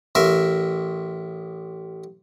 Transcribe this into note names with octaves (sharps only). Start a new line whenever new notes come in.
A1 A#4 E5